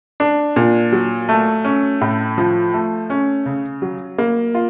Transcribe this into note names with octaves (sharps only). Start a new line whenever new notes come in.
D4
A#2
F#3
A3
C#4
A2
F3
A3
C#4
C#3
F#3
A#3
F4